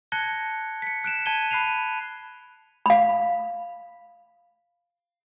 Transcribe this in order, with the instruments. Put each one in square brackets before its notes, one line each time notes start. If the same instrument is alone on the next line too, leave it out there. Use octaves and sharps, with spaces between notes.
[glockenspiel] A5 F#6 G#6 A#6 C#7 G7
B6 C#7
F#6 D7 E7
A5 G#6 D#7 G7
B5 F#6 C7 D#7 F7
[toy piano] F5 B5